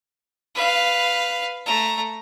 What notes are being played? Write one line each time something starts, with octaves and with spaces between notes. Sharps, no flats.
B4 F5
A3 A#5